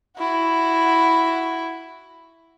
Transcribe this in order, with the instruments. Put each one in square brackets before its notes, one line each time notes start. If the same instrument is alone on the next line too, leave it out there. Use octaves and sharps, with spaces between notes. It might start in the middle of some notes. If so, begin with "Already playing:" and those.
[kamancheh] E4 F#4